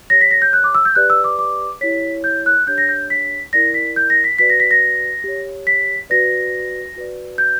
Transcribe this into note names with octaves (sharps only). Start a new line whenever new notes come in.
G4 C#5 A#6
B6
A#6
G6
F#6
D6
E6
G6
G4 B4 D5 F#6
E6
D6
D6
E4 G4 C#5 B6
G6
F#6
D4 G4 C#5 G6
A#6
G6
B6
E4 A#4 D5 A#6
B6
G6
A#6
B6
F#4 B4 D5 B6
A#6
B6
A#6
G4 C#5
B6
F#4 B4 D5 A#6
F#4 B4 D5
G6